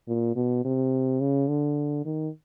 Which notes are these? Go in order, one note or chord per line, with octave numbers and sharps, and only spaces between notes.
A#2
B2
C3
C#3
D3
D#3